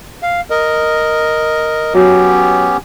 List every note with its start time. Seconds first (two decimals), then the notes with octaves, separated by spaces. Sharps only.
0.23 F5
0.50 A#4 D#5
1.94 F#3 B3 C#4 G4